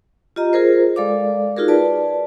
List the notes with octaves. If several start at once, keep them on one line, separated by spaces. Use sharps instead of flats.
F4 G4 D#5 A#5
F4 G#4 A#4 C5
G#3 A4 D5 F5 D6
D#4 F4 F#4 G#4 A#4
B4 D5 A5